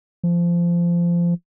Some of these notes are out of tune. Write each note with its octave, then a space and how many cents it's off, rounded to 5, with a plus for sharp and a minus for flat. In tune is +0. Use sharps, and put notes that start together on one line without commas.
F3 -20